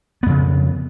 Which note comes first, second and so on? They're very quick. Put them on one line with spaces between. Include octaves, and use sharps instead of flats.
B3 F2 C#3